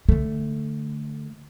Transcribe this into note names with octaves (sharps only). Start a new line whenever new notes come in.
D3 A3